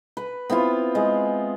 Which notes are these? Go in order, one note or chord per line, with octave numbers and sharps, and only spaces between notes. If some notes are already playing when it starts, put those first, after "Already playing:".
B4
B3 C4 E4 F4
G#3